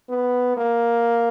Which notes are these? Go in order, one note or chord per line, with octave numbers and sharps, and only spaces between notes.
B3
A#3